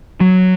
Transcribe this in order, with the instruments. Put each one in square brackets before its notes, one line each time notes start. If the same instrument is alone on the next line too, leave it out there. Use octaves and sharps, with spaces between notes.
[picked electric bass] F#3